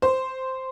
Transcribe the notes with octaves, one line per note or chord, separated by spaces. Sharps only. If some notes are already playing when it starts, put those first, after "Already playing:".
C5